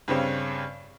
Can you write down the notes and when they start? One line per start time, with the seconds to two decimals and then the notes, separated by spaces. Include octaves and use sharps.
0.08 G2 C#3 C4 C#4